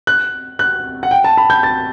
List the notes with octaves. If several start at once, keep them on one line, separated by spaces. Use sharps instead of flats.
F#6
F#6
F#5
G5
A5
B5
G6
A6